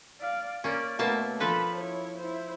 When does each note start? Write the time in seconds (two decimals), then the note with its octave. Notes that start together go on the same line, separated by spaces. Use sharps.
0.21 D5 F5
0.64 A#3 C#4 D5
0.99 B2 A3 A#3 A5
1.40 F3 A4 B4 B5
1.75 E4 C#5
2.18 E4 C5